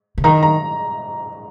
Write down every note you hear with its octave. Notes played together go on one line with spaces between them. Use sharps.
C#3
D#3 A#5
A#5